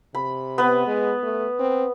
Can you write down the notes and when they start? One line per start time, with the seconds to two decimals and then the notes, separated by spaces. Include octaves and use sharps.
0.14 C3 B5
0.58 B3 B4
0.86 G#3
1.23 A3
1.59 C4